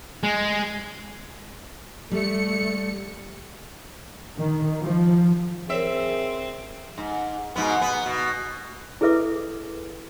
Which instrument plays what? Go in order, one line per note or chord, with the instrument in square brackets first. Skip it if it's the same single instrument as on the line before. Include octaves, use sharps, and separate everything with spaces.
[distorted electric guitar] G#3
[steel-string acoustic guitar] G3 [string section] A3 C#7
[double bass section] D#3
F3
[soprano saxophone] C4 [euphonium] G#4 [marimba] A#4 C5 C#5 [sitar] E5
[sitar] G#2
G#2 B2 B3
B3
B2
[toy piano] E4 G#4 A4 B4 E5 D6